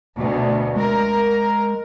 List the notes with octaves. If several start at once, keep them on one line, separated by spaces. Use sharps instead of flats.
D2 B2
G#3 A#4